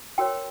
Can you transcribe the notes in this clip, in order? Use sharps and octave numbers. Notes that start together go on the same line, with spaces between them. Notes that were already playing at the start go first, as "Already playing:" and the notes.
F#4 A#4 C#5 G5